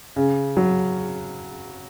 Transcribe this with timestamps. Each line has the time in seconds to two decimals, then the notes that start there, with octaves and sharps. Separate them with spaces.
0.16 C#3
0.57 F#3